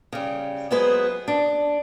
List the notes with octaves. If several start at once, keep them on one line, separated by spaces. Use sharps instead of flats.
C#3 G3
F#3 G#3 B3 G#4 B4 C5
D4